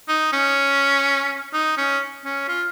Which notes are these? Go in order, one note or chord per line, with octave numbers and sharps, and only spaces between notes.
D#4
C#4
D#4
C#4
C#4
F4